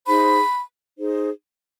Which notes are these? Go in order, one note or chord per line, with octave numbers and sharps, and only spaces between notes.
D#4 G#4 C5 B5
D#4 G#4 C5